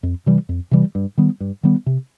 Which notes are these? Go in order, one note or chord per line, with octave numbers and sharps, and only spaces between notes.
F2
C3 E3 G3
F2
C3 E3 G3
G2
D#3 G3 B3
G2
D#3 G3 B3
C3